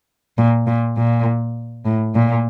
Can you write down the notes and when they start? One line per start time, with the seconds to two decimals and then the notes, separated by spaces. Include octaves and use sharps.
0.38 A#2
0.67 A#2
0.97 A#2
1.85 A2
2.15 A#2